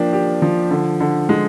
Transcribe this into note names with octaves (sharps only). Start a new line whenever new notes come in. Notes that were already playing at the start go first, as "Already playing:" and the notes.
Already playing: F3 A#3 D4 G4
G4
F3
D3
D3
G#3